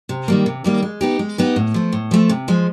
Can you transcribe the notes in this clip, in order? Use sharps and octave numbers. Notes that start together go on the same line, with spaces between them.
C3
D#3 G3 A#3
C3
D#3 G3 A#3
G#3
B3 D#4 G4
G#3
B3 D#4 G4
A2
F3 A3
A2
F3 A3
C3
F3 G#3